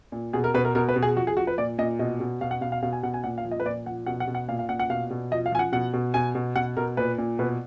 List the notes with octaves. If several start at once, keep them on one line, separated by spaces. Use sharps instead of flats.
A#2
B2 G#4
A#4
B2 B4
A#4
B2 A#4
B4
B2
G#4
F3 F#4
G#4
F3 F#4
B4
A#2 D5
A#2 D#5
B2 D#5
B2
B2 F5
F#5
B2 F5
F5
B2 F5
G#5
B2 F#5
G#5
A#2 F#5
F5
F3
D#5
B4
A#2 D5
F3 F#5
B2 F#5
F#5
B2
F#5
A#2 F5
F5
A#2 F#5
F#5
B2 F5
B2
F3 D#5
F5
F3 G#5
F#5
B2 F#5
B2
B2 G#5
B2
B2 F#5
B2 A#4
A#2 B4
A#2
B2 B4